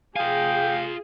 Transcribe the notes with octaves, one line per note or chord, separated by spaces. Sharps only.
F4 G#4 F5 G5 G#5